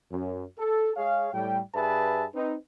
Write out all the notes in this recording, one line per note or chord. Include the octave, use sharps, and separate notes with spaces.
F#2
A4
G#3 G#4 C#5 F5
A2 G3 G5
G2 G#4 B4 E5 A5 B5
C4 D#4 B4